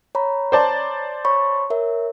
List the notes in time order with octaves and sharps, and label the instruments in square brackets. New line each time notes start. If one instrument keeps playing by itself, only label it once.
[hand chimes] C#5 A#5 B5
[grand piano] C5 D5 A5
[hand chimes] C#5 B5 C#6
A#4 C#5 E5